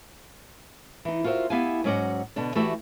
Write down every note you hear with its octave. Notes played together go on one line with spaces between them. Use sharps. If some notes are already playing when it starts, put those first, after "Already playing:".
E3 D#4
F4 F#4 A#4 C5 E5
B3 E4 G4 F5 G#5
G#2 F#3 C#4 D5 D#5 F#5
B2 D3 D4
E3 A3 F#4 G4 D5 E5